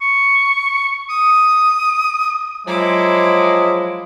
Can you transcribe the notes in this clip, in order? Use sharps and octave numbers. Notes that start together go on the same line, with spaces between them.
C#6
D#6
F3 F#3 G#3 E4 D6